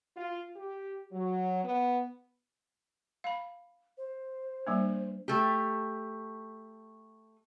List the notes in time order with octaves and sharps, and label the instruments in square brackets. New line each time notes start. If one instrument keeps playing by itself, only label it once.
[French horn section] F4
G4
F#3
B3
[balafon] F5 B5
[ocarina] C5
[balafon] G3 A#3 D4
[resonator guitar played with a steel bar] A3 G4